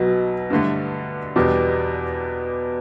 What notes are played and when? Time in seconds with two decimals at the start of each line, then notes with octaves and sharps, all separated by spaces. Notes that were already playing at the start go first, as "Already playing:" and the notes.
Already playing: B1 B2 F#3
0.50 G2 D3 A3
1.36 E2 B2 G3 D4